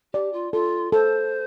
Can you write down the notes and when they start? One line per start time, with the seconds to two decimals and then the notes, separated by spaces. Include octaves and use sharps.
0.13 G4 D5
0.33 F4
0.53 F4 A4
0.92 A4 C5